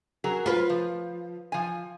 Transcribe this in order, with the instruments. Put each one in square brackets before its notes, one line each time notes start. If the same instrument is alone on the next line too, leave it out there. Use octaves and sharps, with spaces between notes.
[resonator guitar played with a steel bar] F#3 G#4 A#4
[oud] F4 B4
[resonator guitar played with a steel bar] F3
F3 G#5